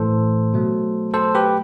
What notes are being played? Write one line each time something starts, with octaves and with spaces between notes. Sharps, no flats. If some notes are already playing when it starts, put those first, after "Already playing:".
Already playing: A2 E3 A3 A4 C5
B2 F#3 A3
A4 C5
G4 B4